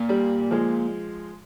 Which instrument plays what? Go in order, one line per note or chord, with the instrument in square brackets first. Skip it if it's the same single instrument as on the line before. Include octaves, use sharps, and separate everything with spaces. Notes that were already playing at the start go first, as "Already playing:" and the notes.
Already playing: [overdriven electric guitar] A#2
[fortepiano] G3
F3 G#3